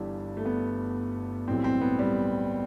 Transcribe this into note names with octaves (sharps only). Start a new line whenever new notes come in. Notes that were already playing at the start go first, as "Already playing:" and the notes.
Already playing: G1 G2 E3 G3
A3
B3
B1 A2 E3 G3 C4
C4
B3
G3